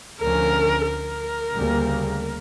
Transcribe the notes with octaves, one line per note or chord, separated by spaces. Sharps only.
D2 D3 F3 C#4 A#4
A#4
D2 C#3 G3 A#3